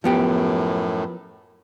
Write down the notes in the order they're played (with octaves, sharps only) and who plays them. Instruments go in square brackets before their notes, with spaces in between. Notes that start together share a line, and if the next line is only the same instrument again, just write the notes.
[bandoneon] F#2 A2 [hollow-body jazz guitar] F3 B3 G4